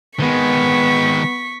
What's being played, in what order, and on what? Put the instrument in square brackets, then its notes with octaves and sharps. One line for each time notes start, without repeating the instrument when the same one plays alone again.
[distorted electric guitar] D#3 G#3 [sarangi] B3 [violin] C#6 B6